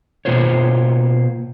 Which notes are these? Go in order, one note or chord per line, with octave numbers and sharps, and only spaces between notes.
B2 A#3 F4 C5 C#5